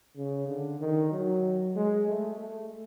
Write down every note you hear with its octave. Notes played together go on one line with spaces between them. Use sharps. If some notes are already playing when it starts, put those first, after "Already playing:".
C#3
D3
D#3
F#3
G#3
A3
A3